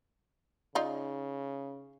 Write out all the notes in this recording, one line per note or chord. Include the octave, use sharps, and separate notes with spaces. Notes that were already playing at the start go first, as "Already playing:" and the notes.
C#3 D#4 F4 D5